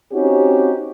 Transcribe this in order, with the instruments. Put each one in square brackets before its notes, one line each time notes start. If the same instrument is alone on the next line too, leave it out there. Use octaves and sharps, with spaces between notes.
[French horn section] C4 C#4 D#4 F#4 G4